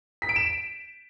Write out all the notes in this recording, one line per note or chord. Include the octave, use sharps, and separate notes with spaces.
B6
D7
E7